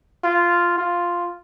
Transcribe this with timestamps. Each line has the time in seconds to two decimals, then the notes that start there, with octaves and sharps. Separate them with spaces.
0.24 F4
0.78 F4